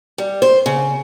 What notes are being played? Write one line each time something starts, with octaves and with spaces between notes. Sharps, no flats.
G3
C5
C#3